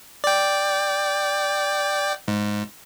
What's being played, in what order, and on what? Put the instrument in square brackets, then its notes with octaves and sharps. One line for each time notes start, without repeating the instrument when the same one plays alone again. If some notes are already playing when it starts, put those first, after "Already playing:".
[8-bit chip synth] D5 G5
G#2